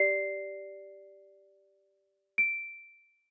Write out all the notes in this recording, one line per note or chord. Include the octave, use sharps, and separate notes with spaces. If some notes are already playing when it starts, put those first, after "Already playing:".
Already playing: G4 D5 C7
D7